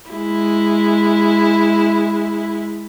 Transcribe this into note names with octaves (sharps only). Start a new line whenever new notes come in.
G#3 E4